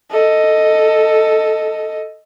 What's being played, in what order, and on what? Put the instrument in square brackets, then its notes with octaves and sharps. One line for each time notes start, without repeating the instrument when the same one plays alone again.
[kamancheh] A4 D#5